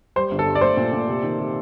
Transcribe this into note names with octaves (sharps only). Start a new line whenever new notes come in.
G3 C5
G1
A4
G2
D5
A3 C5
A#2
A#2
C3
D#3
C3